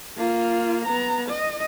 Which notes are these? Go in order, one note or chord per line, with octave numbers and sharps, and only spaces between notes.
A#3 F4
B3 A#5
D#5